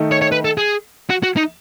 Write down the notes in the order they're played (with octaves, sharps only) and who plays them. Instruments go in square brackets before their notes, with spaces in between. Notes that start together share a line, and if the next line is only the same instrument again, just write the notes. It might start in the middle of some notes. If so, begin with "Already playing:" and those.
Already playing: [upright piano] D#3 A3 D#4
[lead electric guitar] C#5
C#5
B4
A4
G#4
F#4
F#4
D#4